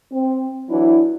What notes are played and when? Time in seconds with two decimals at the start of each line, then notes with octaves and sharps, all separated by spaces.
0.12 C4
0.70 E3 F#3 D4 E4